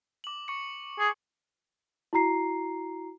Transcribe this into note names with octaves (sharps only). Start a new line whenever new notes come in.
D6 F#7
C#6 C#7
G#4
E4 F#4 A#5 C7